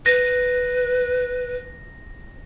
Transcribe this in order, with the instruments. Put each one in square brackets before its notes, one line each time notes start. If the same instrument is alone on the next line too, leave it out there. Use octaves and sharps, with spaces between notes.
[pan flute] B4 [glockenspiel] A#6